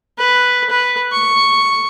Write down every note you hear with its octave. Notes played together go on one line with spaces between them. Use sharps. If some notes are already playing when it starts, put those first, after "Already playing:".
B4
B4
C#6